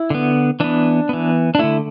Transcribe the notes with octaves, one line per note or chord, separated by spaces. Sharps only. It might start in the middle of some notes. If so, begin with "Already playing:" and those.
Already playing: E4
D3 B3
E3 B3 D4
E3 B3
D4
D3 A3 E4